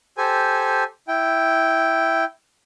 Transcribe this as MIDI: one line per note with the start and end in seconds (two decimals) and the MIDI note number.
0.17 0.84 67
0.17 0.84 69
0.17 0.84 72
0.17 0.84 80
1.08 2.25 64
1.08 2.25 79